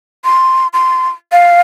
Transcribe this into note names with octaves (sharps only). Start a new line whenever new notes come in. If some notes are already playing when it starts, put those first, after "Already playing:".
C6
C6
F5